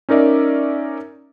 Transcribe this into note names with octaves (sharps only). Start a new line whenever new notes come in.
C#4 D#4 A#4 D5 E5